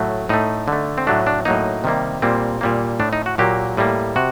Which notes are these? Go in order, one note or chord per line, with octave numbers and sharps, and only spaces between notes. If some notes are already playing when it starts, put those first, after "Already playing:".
Already playing: A2 F#3 A3
A2 A3 D#4
D3 A3
C4
A2 F#3 A3 D4
D4
A2 F#3 A#3 D#4
C3 D#3 G3 A#3
A#2 G3 A#3 C4
A#2 G3 A#3
A2 A3 D4
D#4
F#4
A#2 F#3 A#3 G4
A2 G3 A#3
C3 F#4